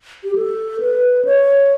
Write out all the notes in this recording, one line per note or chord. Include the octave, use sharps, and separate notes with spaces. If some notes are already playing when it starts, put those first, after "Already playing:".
G4
A4
B4
C#5